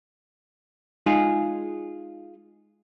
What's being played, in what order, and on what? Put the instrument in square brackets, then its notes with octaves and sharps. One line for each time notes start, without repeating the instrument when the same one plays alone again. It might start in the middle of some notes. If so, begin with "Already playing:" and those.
[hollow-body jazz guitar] G#3 D#4 F4 G#4